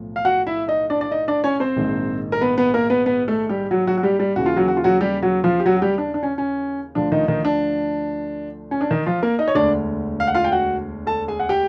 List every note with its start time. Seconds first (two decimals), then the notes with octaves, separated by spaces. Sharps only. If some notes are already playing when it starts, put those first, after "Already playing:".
Already playing: B1 A2 F3
0.16 F5
0.25 F#4 F#5
0.47 E4 E5
0.68 D#4 D#5
0.90 D4 D5
1.01 D5
1.11 D#4 D#5
1.28 D4 D5
1.44 C#4 C#5
1.60 C4 C5
1.76 A#1 G#2 D#3
2.32 A#4
2.41 B3 B4
2.57 B3 B4
2.74 A#3 A#4
2.90 B3 B4
3.06 B3 B4
3.28 A3 A4
3.49 G3 G4
3.71 F#3 F#4
3.87 F#3 F#4
3.98 F#4
4.03 G3 G4
4.19 G3 G4
4.36 D#2 C#3 E3 F#4
4.46 F4
4.56 F#3 F#4
4.68 F#4
4.77 F4
4.84 F#3 F#4
5.01 G3 G4
5.22 F#3 F#4
5.44 F3 F4
5.60 G4
5.66 F#3 F#4
5.77 F#4
5.82 G3 G4
5.98 D4
6.14 D4
6.23 C#4
6.38 C#4
6.95 D2 D3 F3 D4
7.12 D#3 D#4
7.28 D#3 D#4
7.45 D4
8.71 C#4
8.81 D4
8.91 D#3 D#4
9.06 F3 F4
9.23 A#3 A#4
9.39 D#4 D#5
9.48 C#5
9.55 E1 D2 D3 D4 D5
10.20 F5
10.27 F#5
10.35 F4 F5
10.44 G5
10.52 F#4 F#5
11.07 A4 A5
11.28 G#4 G#5
11.40 F#5
11.49 G4 G5